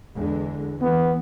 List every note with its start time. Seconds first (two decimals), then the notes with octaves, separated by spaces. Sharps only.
0.16 E2 D3 G#3
0.81 E3 B3